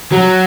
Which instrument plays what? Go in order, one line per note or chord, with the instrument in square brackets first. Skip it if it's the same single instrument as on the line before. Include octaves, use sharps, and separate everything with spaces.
[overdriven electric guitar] F#3